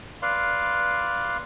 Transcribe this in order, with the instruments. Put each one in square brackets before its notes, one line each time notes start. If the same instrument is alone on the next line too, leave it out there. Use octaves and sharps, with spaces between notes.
[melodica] B4 D5 F5 C6